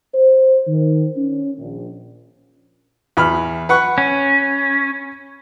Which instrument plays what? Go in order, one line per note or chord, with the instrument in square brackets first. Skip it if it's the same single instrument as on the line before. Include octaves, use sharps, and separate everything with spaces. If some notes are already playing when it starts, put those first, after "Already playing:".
[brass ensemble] C5
D#3
C#4
A#1
[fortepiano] E2 B5 F6
B4 F#5 C#6
[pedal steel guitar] C#4